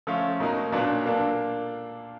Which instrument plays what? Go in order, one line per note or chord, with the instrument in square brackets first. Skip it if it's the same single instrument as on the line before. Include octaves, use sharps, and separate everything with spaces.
[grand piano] F3 A3 C#4 F4
B2 F#3 A#3 D#4
A#2 F#3 B3 D4 F4
A#3 D4 F4 A4